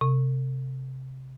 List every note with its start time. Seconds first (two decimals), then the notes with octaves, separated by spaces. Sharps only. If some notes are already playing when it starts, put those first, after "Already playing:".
0.01 C3